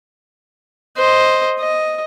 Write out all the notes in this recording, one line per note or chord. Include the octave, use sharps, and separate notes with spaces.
C5 D#5
D#5